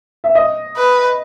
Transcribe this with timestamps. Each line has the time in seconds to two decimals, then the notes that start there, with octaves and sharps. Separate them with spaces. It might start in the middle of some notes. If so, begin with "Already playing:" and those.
0.24 E5
0.35 D#5
0.77 B4